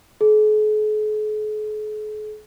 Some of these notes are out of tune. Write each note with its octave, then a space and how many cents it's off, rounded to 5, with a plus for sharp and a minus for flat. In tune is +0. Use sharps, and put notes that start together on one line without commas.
G#4 +45